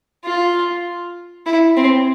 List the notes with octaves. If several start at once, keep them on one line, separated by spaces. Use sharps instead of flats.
F4
E4
C4